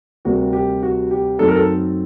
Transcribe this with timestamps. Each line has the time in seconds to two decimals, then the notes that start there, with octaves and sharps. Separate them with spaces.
0.25 D2 C3 G3 A#3 F#4
0.53 G4
0.83 F#4
1.11 G4
1.39 F#2 F#3 A3 C4 D#4 A4
1.48 A#4
1.56 A4